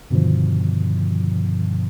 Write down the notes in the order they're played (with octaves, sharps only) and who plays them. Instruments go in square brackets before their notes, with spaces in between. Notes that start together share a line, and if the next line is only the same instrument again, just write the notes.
[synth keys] G2 B2 D3 D#3 F3